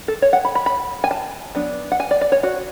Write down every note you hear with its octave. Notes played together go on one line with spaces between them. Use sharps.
A4
C#5
F#5
B5
B5
B5
G#5
A5
F#3 B3 D4
F#5
G#5
D5
D5
C#5
F#4